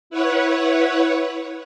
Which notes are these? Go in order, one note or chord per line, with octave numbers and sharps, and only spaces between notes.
E4 B4 C#5 F#5